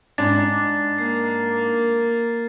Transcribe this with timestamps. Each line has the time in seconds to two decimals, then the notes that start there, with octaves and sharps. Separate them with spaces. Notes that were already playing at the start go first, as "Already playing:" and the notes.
0.18 G#2 D4 A6
0.98 A#3 C7